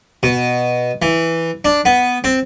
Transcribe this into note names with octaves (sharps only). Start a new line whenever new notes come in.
B2
E3
D4
B3
C4